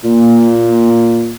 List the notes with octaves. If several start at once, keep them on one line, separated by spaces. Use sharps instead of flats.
A#2 A#3